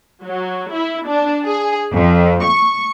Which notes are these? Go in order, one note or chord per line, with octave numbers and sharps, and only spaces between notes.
F#3
E4
D4
G#4
F2
C#6